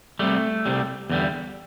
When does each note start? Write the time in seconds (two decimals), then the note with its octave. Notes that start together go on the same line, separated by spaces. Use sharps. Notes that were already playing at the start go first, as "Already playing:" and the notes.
0.19 C2 C3 G3 A3
0.66 C2 C3 G3
1.10 E2 D3 G3